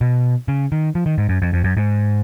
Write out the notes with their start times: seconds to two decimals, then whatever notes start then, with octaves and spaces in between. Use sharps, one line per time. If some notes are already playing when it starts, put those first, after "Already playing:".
0.01 B2
0.48 C#3
0.72 D#3
0.95 F3
1.06 D#3
1.18 G#2
1.29 F#2
1.42 F2
1.53 F2
1.64 F#2
1.77 G#2